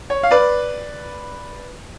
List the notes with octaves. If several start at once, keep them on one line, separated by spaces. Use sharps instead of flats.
C#5
F5
B4 D5